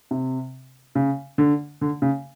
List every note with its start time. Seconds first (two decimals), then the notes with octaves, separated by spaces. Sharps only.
0.11 C3
0.95 C#3
1.38 D3
1.81 D3
2.02 C#3